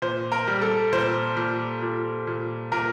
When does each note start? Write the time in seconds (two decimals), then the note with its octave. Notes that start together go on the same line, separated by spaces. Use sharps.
0.02 A#2 C5
0.32 A#4
0.47 G3
0.62 A4
0.92 A#2 C5
1.37 A#2
1.82 A#2
2.27 A#2
2.72 A#2 A#4